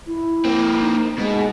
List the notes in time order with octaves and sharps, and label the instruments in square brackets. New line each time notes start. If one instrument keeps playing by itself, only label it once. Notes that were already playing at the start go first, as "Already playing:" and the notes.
[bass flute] E4
[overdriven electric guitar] A#3 C4
[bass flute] D#4
[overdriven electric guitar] B2 [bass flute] G#3